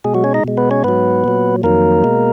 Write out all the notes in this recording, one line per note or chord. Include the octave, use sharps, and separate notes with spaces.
B2 G#3 G#4
F#3 F#4
C#4 C#5
D#4 D#5
B2 G#3
B3 B4
C#4 C#5
G#2 F#3 B3 B4
A#2 F#3
F2 D#3 F#3 A#3 A#4
B2 G#3